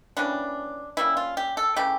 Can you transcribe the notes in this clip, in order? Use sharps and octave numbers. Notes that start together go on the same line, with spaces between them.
E3 G3 A#3 C#4 D4
E3 G3 A#3 C#4 E4
F4
G4
A4
C#3 E3 A3 C#4 G4